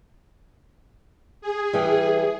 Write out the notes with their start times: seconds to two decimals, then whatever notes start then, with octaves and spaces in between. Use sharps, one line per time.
1.41 G#4
1.73 E3 G3